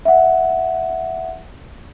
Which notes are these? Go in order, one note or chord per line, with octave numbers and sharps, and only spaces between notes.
E5 F#5